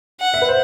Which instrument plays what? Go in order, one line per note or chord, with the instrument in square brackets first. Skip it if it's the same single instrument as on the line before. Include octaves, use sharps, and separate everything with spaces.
[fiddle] F#5
[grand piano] E5
B4
C5